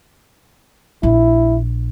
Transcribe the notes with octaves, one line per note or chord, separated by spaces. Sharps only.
A#1 E4